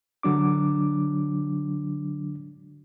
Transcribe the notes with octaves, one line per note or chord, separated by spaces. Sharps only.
D3 F#3 D4 D6